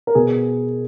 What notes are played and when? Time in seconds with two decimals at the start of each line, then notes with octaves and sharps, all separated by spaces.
0.07 A#4
0.15 B2 G#4